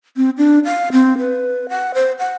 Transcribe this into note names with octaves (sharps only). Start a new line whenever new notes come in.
C4
D4
F5
C4
B4
F#5
C5
F#5